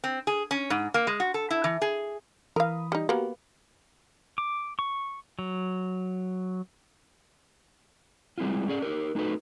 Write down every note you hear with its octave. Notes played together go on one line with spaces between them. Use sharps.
C4
G#4
C#4
G#2
A#3
G#3
F#4
A4
E4
E3
G#4
E3 A#4 F5 B5 D#6
G3 D#4
A#3 B3 F#4 G4 A#4
D6
C#6
F#3
G3 G#3 C4 E4 F4
C#4 G#4 D5
D#4 G4 A#4
A3 D#4 F#4 A4 B4